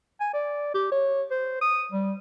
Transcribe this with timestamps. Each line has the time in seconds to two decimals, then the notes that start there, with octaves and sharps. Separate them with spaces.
0.21 G#5
0.34 D5
0.74 G4
0.92 C#5
1.31 C5
1.61 D#6
1.92 G3